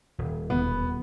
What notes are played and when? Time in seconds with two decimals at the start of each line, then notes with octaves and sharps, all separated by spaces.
0.18 D#1
0.50 E1 B3